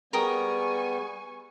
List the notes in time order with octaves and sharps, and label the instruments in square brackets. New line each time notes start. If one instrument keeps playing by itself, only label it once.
[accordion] G3 B3 [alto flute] G#4 [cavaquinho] A#4 G5 D#6 [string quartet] G#5 C#6